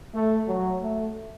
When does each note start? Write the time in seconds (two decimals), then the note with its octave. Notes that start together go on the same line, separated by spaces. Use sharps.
0.13 A3
0.47 F#3
0.82 A3